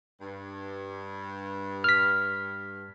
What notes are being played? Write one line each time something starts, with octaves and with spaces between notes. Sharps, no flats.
G2
F6 B6